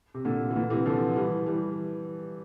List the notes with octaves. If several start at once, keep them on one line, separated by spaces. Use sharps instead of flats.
C3
A#2 D3
E3
A#2 D3
C3 E3
D3 F3
E3 G3
E3 G3